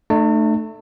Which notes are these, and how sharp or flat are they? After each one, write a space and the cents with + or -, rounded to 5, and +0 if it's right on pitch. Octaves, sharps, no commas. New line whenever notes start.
A3 +0 D4 +45 A5 +45